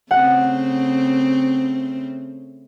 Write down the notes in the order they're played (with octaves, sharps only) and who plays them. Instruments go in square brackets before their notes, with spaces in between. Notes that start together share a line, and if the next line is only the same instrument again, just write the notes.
[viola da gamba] C#3 A3 C4 [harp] F#5